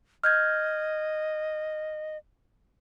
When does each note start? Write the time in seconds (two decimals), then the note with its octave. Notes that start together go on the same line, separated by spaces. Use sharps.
0.24 D#5 F6 G6 G#6